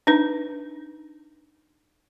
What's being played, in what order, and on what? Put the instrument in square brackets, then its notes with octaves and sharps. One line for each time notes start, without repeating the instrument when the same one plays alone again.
[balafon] D4 D#4 B4